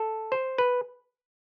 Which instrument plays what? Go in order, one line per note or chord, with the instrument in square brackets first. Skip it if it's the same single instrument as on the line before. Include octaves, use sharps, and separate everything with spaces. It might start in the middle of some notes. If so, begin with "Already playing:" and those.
Already playing: [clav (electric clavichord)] A4
C5
B4